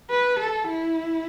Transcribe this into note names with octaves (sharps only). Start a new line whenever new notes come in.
B4
A4
E4